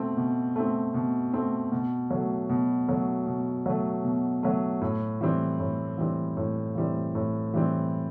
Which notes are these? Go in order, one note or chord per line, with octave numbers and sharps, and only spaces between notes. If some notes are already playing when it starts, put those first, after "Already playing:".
Already playing: B2 A3 C4
B2
A3 C4
B2
A3 C4
B2
F#3 A3
B2
F#3 A3
B2
F#3 A3
B2
F#3 A3
A2
E3 G3 C4
A2
E3 G3 C4
A2
E3 G3 C4
A2
E3 G3 C4